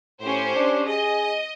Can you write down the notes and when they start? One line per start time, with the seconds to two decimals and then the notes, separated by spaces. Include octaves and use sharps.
0.21 A2 C#4 G4 C5
0.56 D4
0.86 G#4 D#5